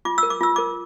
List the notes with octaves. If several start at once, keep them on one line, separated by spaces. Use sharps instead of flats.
F4 D6
E6
A#4
D6
F4 E6
A#4 D6